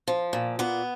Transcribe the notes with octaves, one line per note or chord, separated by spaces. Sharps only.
F3
A#2
A#2 B3